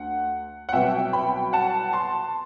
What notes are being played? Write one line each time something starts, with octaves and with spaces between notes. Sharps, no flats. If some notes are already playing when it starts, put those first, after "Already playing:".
Already playing: D2 F#5
F#5
C2 B2 F#3 E5 G5
G5 B5
F#5 A5
A5 C6